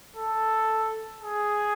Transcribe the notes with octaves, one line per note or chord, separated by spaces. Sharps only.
A4
G#4